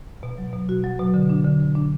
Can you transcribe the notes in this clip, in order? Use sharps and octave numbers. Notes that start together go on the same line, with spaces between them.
B2
F#3
B2
F#4
F#3
B2
D3
D4
D3
D3
D4